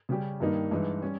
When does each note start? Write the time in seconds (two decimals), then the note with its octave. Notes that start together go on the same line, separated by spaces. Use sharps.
0.09 C#3 G3 C#4 G4
0.40 G2 D#3 G3 A#3 D#4
0.71 G2 E3 G#3 D#4
1.02 G3 C#4